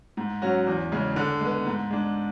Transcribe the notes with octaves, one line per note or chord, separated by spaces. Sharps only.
G#2
F#3 C#4 F#4
E2
C#3 G#3
D3
G#3 B3
G#2
G#3 D4